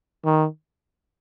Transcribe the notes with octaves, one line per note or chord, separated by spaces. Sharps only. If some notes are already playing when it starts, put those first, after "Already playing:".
D#3